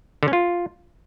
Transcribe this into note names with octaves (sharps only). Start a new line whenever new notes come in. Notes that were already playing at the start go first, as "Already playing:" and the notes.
D3
C#4
F4